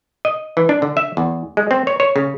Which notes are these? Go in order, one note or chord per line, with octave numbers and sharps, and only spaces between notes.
D#5
E3
D4
D3
E5
E2
G#3
C4
C#5
C#5
C#3